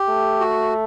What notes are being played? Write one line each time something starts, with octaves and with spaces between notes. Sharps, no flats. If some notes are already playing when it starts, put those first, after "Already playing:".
Already playing: G4
A3
F#4